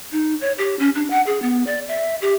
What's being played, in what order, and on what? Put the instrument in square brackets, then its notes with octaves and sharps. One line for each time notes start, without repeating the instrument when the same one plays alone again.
[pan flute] D#4
C#5
G4
C#4
D4
F#5
G#4
B3
D5
E5
G4